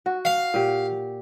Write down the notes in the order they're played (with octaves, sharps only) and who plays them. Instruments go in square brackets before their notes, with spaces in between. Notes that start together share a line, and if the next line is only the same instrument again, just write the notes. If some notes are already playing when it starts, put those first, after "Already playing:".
[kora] F#4
[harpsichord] F5
[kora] A#2 G4